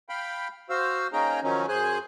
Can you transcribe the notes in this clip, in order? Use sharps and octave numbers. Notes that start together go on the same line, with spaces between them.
F5 G5 B5
F#4 C5 F5 E6
A#3 C#4 D#4 G#4 G5 A#5
D#3 F3 F#3 C#4 D#4
F#2 G#4 C5 G#5 F#6